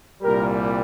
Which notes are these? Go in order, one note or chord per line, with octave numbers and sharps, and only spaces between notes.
C2 A#2 G3 G4 A#4